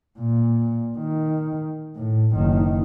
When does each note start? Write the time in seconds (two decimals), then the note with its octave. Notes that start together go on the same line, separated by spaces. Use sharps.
0.19 A#2
0.98 D#3
1.96 A2
2.35 F#1 D#3